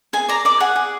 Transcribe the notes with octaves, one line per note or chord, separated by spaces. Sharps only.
G#4 G#5
D5 A#5
D5 D6
G#4 F#5
G#4